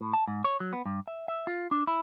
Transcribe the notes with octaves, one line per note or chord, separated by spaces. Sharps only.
A2
A5
G#2
C#5
F#3
B3
G2
E5
E5
F4
D4
E4